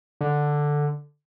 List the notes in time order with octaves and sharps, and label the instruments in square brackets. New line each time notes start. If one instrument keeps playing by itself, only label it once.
[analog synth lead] D3